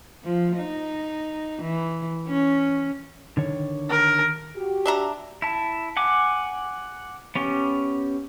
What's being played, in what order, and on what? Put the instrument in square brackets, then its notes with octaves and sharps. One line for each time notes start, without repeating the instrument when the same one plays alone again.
[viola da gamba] F3
D#4
E3
C#4
[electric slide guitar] D3 D#3 C#5
[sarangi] A#4
[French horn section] F#4 G4
[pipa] D4 E5 A#5
[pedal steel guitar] E4 A5
F#5 G#5 D6
B3 C#4 G4